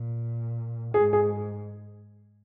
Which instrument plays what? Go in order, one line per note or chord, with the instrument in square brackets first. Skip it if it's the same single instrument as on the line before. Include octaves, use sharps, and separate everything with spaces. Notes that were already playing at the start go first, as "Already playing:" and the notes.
Already playing: [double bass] A#2
[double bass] G#2 [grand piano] G#4
[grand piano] G#4